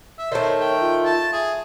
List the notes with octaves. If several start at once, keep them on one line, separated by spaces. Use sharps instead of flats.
E5
D#3 A3 C5 C#5
G5
F4
A5
G#4 E5